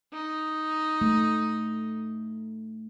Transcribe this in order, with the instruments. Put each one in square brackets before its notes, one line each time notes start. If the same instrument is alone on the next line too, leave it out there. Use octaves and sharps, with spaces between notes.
[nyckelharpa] D#4
[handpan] A3